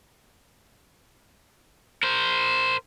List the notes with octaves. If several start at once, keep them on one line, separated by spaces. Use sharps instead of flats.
A#4 C5